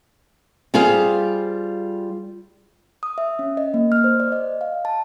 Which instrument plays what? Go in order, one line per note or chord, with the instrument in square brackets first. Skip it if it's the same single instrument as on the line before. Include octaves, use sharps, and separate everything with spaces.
[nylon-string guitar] G3 F4 G#4 C5 F5
[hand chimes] D#6
E5
C#4
D#5
A#3
F6
C5
D5
D#5
F5
A5